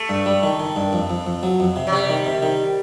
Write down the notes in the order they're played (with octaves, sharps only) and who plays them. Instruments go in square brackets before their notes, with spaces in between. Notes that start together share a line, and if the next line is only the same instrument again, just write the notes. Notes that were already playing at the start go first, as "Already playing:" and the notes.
Already playing: [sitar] A3
[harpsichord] G2
G3
D#3
D#3
G2
F2
F2
F2
F#3
F2
C3
[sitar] F#3
[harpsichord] C3 [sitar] G3
[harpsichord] D#3
C3
D#3